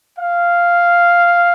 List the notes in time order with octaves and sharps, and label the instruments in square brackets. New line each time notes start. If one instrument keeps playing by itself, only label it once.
[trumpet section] F5